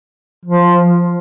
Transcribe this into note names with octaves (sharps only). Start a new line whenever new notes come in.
F3